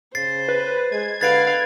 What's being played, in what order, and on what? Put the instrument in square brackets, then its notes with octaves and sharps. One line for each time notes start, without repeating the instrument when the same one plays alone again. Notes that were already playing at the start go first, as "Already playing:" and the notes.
[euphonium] C#3 [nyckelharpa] C5 [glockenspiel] A6 C7
[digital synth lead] B4
[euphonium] G#3 [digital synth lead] G#6
[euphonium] D3 [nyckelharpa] B4 F5 [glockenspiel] A6 C7 D7